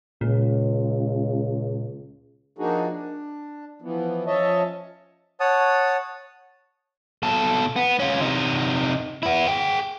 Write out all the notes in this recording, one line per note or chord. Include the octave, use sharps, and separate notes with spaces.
C#2 A#2
F3 A#3 D4 D#4 F#4 G#4
D4
E3 F3 B3
F3 C#4 C#5 D#5 E5 A5
C#5 F#5 A5 D#6
B2 A4
B3
C#4 F4
C3 D#4
B3 E4
G#4 G5